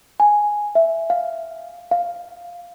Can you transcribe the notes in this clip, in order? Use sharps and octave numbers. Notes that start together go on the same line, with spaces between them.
G#5
E5
F5
F5